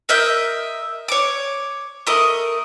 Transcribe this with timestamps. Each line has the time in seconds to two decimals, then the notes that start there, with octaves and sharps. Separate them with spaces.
0.09 A#4 D#5 E5 G6
1.08 C#5 D6
2.07 A3 A#4 D#5